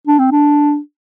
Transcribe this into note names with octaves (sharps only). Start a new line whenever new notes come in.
D4
C4
D4